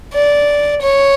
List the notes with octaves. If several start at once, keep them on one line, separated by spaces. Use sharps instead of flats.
D5
C#5